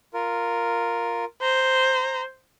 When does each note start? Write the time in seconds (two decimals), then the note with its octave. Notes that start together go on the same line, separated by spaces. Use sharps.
0.14 F4 A#4
1.42 C5 A#5